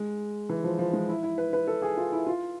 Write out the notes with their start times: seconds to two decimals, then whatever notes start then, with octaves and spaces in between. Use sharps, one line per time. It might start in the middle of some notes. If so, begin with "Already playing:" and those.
Already playing: G#3
0.49 E3
0.64 F3
0.79 F3
0.93 G#3
1.09 E4
1.23 E4
1.38 B4
1.53 B4
1.68 A4
1.82 G#4
1.97 F4
2.12 E4
2.27 F4